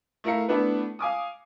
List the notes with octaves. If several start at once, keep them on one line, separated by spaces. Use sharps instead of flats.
A3 E4 A#4 F5 C#7
A3 B3 D4 E4 B4
F5 G#5 D6 D#6